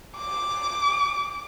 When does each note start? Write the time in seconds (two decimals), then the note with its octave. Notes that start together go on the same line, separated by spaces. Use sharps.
0.17 D6